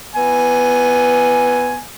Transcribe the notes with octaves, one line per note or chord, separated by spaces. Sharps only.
B3 G#5